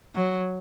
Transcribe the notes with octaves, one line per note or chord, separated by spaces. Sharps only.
F#3